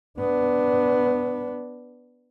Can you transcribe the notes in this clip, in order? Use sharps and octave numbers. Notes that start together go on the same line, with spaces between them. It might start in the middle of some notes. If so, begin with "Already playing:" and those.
B3 D4